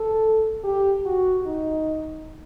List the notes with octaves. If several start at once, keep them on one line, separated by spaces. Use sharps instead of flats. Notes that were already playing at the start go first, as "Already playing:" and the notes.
Already playing: A4
G4
F#4
D#4